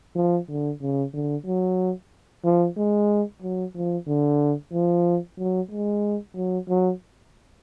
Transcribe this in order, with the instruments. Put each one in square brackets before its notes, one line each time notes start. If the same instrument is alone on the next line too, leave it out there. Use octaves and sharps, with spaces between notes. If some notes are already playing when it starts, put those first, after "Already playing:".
[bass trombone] F3
D3
C#3
D3
F#3
F3
G#3
F#3
F3
D3
F3
F#3
G#3
F#3
F#3